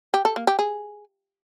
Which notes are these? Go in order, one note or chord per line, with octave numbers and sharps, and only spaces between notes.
G4
A4
A#3
G4
G#4